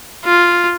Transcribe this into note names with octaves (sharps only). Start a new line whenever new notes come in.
F4